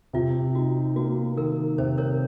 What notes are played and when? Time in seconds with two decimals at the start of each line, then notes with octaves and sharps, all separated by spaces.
0.13 C3 F4
0.55 D#4 F#4
0.96 A#3 F#4
1.36 D#3 A#4
1.78 C3 C5
1.98 A#4 C#5